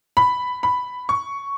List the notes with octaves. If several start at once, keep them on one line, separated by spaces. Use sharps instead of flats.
B5
B5
C#6